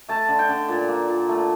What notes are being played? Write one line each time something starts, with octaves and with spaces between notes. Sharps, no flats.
A3 A5
D3
G5
D3
A#2
A#3
A#2
A3